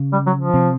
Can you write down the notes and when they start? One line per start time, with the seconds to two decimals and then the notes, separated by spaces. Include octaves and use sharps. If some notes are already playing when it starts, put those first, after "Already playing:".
Already playing: C#3 C#4
0.13 G3
0.27 F#3
0.41 F3
0.54 C3 C4